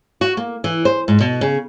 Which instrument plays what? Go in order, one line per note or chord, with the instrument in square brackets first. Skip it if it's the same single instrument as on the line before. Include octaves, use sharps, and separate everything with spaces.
[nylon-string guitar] F#4
A#3
E3
C5
G#2
B2
C#3